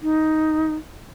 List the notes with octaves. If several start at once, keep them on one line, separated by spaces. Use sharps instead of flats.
D#4